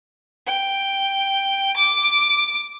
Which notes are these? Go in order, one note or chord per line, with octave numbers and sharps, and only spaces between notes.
G5
D6